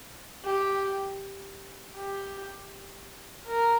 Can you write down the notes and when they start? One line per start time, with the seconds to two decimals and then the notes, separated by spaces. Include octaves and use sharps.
0.45 G4
1.96 G4
3.47 A#4